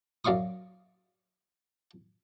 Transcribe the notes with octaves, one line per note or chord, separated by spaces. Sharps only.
F#2 D5 F5 C#6 D#6